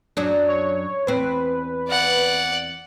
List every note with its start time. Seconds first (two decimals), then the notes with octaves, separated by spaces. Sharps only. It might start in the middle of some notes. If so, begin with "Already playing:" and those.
0.17 F#2 F#3 D4
0.48 C#5
1.07 E2 C4 B4
1.89 D5 F#5